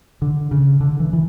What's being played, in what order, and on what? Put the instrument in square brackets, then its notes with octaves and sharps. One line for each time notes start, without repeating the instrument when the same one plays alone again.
[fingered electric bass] D3
C#3
D3
E3
E3